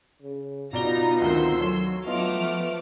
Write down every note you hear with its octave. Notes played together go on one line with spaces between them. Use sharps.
C#3
B2 B3 D#4 F4 D5 A#5 G7
D2 D#3 C4 C6 E6
F#3 A4 C#5
A3 B3 F4 D#5 D6 F6
F3